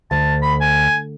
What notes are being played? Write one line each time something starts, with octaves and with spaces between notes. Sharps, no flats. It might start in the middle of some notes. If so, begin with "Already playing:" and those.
D2 A5
B5
G#5